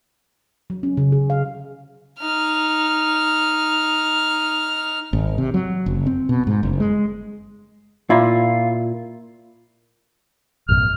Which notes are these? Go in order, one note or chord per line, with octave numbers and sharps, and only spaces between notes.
F#3
C#4
C#3
G#4
F5
D#4 F6
G#1
C3
F#3
F#1
C4
B2
G#2
F#1
G#3
A#2 E4 F4
A1 F#2 B2 F6